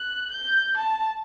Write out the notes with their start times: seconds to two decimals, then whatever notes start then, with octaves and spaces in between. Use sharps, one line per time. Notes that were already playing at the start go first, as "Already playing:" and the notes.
Already playing: F#6
0.31 G6
0.77 A5